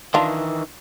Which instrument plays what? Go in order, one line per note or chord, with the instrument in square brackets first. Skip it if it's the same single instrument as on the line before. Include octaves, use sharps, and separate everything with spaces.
[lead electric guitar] D#3 E3 [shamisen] D4 F4